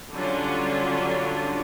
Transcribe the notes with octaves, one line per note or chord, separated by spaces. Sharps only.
D3 F#3 G3 C#4 D4 F4